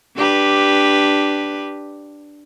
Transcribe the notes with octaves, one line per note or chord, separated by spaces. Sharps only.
D4 G4 B4